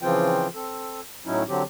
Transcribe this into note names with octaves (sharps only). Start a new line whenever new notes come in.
C#3 E3 F3 C4 F4 G5
C4 A4
A2 F#3 C#4 D#4 E4
D3 F#3 C4 G4